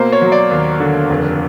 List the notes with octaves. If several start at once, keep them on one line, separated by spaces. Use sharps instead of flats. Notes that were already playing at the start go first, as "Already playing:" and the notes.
Already playing: B2 A#3 C5
C#5
F#3
D5
D#2
D3
F1